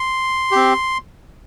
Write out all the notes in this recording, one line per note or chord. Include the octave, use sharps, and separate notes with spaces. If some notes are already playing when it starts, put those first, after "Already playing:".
Already playing: C6
C4 G4